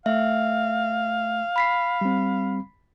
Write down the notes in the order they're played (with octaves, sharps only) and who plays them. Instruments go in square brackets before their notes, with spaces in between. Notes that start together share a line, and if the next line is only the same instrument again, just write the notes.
[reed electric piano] A3 [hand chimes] E5 [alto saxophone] F5
[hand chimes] B5 B6 C7
[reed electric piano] G3 C4